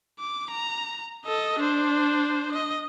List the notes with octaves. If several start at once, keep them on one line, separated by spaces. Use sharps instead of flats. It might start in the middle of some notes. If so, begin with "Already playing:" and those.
D6
A#5
A4 D#5
D4 C5
D#5